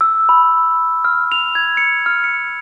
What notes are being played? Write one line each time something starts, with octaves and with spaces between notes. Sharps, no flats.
E6
B5
F6
F7
G#6
C#7
F6
C#7